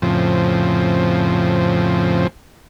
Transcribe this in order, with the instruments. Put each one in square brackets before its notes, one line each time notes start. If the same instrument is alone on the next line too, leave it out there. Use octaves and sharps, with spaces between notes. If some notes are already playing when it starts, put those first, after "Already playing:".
[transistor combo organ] F2 A2 C#3 F3 C4